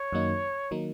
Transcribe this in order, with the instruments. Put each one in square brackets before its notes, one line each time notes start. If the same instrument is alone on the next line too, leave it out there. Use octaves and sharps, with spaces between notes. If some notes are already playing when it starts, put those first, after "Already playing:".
Already playing: [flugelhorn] C#5
[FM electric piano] F#2 D#3 F#3 A#3 D#4
D#3 F#3 A#3 D#4